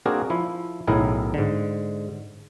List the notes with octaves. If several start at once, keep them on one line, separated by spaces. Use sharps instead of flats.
A#3 C4 D4 F#4 G#4 A#4
F3 E4
B1 A2 D#3 E4 G#4 A#4
G#2 D3